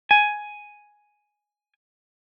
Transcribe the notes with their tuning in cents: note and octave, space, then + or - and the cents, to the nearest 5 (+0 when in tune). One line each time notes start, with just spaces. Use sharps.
G#5 +5